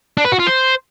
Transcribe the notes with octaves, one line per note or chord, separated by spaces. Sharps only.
D4
B4
F#4
F4
C5